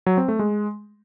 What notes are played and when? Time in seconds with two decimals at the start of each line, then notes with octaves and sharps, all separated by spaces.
0.06 F#3
0.17 C4
0.28 A3
0.39 G#3